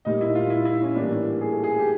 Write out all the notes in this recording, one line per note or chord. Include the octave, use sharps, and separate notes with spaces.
A#2 G3 A#3 D#4
E4
F4
E4
E4
C#4
A2 E3 G3 A#3 D4
G#4
A4
G#4
G4